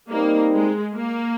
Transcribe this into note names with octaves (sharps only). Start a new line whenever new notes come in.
G3 A#3 C4 D#4 A#4
G#3
A#3